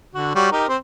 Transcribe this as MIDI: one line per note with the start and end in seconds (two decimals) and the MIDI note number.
0.15 0.34 50
0.15 0.34 66
0.35 0.51 55
0.35 0.51 66
0.35 0.51 73
0.52 0.66 63
0.52 0.66 67
0.52 0.66 70
0.69 0.77 60
0.69 0.77 72